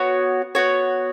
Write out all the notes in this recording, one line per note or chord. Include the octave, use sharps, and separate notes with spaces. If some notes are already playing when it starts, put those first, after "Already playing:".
Already playing: B3 F#4 C#5
B3 F#4 C#5